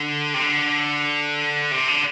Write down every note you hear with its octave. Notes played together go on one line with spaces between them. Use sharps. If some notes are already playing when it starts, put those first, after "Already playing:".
Already playing: D3
C3
D3
C3
D3